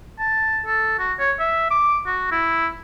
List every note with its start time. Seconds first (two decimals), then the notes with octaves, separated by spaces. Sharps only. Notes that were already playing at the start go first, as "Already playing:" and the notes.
0.19 A5
0.66 A4
0.99 F#4
1.19 C#5
1.40 E5
1.70 D6
2.06 F#4
2.32 E4